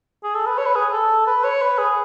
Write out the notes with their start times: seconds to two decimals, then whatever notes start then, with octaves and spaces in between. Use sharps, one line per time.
0.23 G#4
0.35 A4
0.46 B4
0.58 C#5
0.66 B4
0.75 G#4
0.92 A4
1.27 B4
1.44 C#5
1.61 B4
1.78 G#4